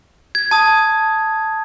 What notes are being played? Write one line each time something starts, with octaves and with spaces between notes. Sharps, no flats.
G#6
A5 D#6